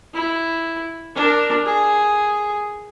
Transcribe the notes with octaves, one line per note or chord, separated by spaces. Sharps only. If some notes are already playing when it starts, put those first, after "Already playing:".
E4
D4 A#4
G#4